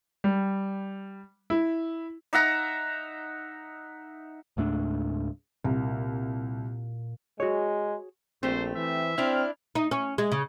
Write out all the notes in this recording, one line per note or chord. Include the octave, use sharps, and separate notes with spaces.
G3
E4
D#4 E5 F#5 A#5
C#2 G#2 A3 D4
C2 A#2
G#3 F#4 G#4 C#5
A#1 A3 C4 G4 C5
E3 E5
C4 D4 E4 F6
D#4
C#4
G#3
C#3